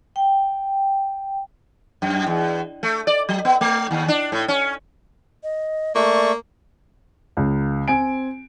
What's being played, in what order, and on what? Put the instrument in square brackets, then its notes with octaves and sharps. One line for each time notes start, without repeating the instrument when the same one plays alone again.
[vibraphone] G5
[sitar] F#2
E2
A3
D5
F#3
B3
A3
D#2
D4
A2
C#4
[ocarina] D#5
[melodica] A3 C#6 [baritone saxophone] A#3 [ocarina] D5
[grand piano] C#2
C4 G#5 D7